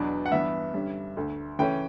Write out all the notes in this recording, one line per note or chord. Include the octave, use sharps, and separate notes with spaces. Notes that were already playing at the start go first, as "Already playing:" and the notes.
Already playing: E2 B2 F#3 B3 D4
F#5
G2 E3 B3 D4 E5
G2 D3 G3 C#4
D2 D3 A3
C#3 E3 A3 C#4 G5